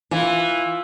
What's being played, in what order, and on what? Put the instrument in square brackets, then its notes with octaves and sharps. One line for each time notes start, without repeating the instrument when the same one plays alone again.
[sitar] E3 [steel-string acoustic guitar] F4